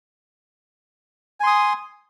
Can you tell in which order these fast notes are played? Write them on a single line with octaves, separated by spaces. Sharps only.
G#5 C6 D#6